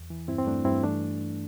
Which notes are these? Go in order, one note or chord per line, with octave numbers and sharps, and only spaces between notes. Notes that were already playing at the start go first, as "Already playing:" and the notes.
Already playing: E2
E3
G2 C4 E4
C4
G2 A3 D4
G2 C4 E4
E3 A3 D4